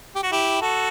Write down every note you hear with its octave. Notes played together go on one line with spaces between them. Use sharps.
G4
F#4
E4 G4
F#4 A4